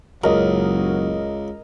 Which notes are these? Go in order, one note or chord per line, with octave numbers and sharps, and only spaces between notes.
F#1 C#2 F#3 A#4 D#5